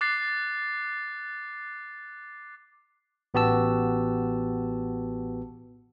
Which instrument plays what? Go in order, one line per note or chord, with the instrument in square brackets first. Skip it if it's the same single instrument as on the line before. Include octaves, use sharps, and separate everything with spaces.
[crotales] D6 F#6 A6 C7
[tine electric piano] A1 B3 F#4 G4 A5 E6